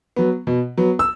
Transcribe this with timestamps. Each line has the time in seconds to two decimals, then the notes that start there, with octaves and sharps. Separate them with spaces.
0.16 F#3 B3
0.47 B2
0.78 F#3 B3
0.99 E6